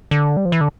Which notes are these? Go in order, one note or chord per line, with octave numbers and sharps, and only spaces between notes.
D3
G3
F3
E3
D3